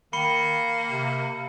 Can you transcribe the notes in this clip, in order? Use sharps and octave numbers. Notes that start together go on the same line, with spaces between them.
D#3 A#3 B5 C#7 G7
C3